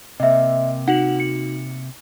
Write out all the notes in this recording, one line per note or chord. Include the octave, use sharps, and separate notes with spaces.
C3 A#3 D#5 E5
D#4 F#4 F#5 F#7
C#7